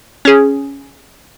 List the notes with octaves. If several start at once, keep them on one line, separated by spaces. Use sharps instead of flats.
C#4 G#4